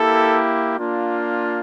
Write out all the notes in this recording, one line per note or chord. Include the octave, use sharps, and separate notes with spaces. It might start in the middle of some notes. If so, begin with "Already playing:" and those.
Already playing: A#3 E4 G4 A4
A#3 D4 F4